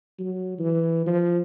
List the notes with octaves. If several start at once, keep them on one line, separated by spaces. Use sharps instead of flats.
F#3
E3
F3